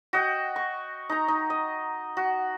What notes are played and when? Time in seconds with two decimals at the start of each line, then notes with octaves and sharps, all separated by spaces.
0.13 F#4 D#5 G5
0.56 C#6
1.09 D#4 A#5
1.28 D#4
1.50 D#5
2.17 F#4